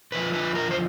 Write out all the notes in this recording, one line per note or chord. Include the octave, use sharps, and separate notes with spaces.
F2 D3 F3 B4
B4
A#4
C5